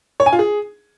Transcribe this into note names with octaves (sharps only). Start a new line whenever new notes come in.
C#5
G#5
F4
G#4